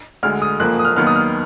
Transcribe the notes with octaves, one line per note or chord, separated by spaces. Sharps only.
D2 D3 G#3 F6
D#6
F#1 F2 F3 A#3 F#6
D#6
F6
D#2 D#3 F#3 B3 F6
D#6
F6